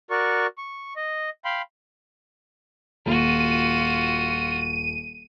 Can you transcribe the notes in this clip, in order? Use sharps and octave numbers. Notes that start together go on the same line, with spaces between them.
F#4 A#4 D5 C#6
C#6
D#5
F5 G5 B5 C6
D#1 F4 F#4 D#7